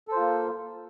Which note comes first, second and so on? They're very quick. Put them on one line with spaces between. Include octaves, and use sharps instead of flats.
A4 C5 F4 A#3